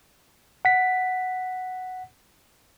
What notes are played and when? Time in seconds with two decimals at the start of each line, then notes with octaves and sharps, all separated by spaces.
0.65 F#5 B6